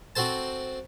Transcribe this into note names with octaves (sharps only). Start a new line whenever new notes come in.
C4 F#4 A4 C5 A5